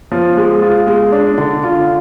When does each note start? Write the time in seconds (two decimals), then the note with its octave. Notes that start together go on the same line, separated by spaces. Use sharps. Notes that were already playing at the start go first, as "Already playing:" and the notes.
0.12 F3
0.37 G#3
0.62 F4
0.87 G#3
1.12 D4
1.38 D3
1.64 F4